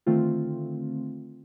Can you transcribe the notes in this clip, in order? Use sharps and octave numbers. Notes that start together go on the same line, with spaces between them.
D3 D#3 A3 C4 F4